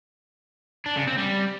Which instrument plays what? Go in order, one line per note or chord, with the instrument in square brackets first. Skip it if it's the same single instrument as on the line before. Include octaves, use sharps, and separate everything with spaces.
[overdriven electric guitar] D4
C#3
C4
G3